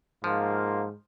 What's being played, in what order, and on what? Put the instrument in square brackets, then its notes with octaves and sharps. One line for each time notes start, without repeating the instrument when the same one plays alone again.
[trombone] G#2 [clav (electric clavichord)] F3 [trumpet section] A#3 F4